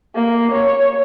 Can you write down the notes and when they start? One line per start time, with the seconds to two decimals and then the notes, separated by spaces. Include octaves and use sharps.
0.15 A#3
0.52 C#5